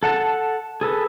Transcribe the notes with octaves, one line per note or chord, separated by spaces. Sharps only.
A4 F#5 A5
G#4 A4 B4